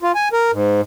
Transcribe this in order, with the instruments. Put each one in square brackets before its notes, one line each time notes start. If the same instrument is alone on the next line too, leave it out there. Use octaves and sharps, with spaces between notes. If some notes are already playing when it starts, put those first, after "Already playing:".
[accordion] F4
G#5
A#4
G#2